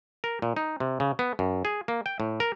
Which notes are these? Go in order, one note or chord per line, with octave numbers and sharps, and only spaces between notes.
A#4
A#2
D#4
C3
C#3
B3
F#2
G#4
A#3
G5
A2
A#4